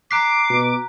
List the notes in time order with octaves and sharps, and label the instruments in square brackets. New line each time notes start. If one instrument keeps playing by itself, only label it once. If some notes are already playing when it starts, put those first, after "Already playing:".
[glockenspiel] A#5 F#6 B6 [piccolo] D6 [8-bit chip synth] C7
[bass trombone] B2